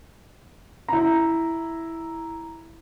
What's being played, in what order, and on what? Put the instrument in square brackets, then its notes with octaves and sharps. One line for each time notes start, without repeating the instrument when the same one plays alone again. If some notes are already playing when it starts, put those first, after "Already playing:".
[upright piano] E4 A#5